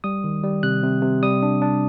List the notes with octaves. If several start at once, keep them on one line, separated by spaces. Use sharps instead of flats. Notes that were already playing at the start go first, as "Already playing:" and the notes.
G3 D#6
D#3
G3
C3 F#6
C3
C3
G3 D#6
D4
D4